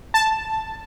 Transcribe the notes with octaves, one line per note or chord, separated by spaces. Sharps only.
A5